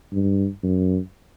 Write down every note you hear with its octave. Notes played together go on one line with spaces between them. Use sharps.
G2
F#2